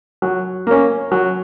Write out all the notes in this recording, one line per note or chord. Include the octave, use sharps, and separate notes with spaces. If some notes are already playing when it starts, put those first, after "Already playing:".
F#3
A#3 C#4
F#3